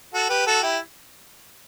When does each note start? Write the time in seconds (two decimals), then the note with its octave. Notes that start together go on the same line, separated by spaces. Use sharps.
0.14 F#4 A4
0.30 G4 B4
0.47 F#4 A4
0.62 E4 G4